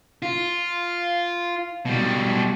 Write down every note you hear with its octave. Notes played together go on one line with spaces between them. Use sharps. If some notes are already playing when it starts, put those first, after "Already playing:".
F4
B2 G3